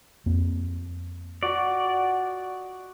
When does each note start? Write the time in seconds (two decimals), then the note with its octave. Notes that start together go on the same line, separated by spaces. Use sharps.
0.26 F2 A#3 C4
1.43 F#4 D5 D#5